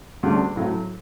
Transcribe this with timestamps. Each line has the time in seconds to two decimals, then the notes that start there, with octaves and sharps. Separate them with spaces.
0.23 D2 C#3 G3 D4 F#4
0.56 A2 F#3 A3